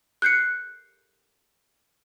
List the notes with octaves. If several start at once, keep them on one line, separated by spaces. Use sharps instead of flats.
F#6 G6 C7 C#7